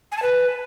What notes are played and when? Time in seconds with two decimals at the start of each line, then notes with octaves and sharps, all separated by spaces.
0.12 G#5
0.17 A5
0.22 B4